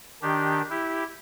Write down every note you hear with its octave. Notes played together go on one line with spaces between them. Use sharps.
D#3 D4 G4
E4 G4